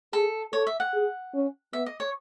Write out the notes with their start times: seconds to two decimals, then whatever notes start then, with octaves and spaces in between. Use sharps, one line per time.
0.13 G#4 A4
0.53 A4 C#5
0.67 E5
0.80 F#5
0.93 G#4
1.34 C#4
1.73 B3 E5
1.86 D#5
2.00 C#5